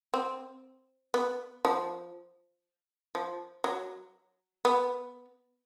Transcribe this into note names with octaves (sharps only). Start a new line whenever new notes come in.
C4
B3
F3
F3
F#3
B3